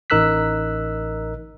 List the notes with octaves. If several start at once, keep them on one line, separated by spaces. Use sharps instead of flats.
A1 D#4 A#4 E6 F#6 B6